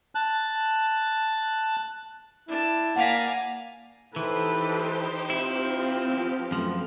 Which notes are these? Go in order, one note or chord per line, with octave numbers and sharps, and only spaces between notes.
A5 F#6
D4 E4 A5
A#3 D5 F5 F#5 G#5 A#5 B6
E3 D#4 G4 A4 B4 C5
C4 E4 F4
F3 B3 G4
F#2 F3 A3 B3